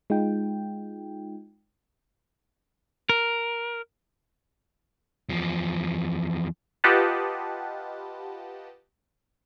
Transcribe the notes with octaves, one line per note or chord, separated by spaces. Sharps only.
G#3 D#4 F4 G5
A#4
E2 F3
F4 G4 B4 D#5 F#5 A5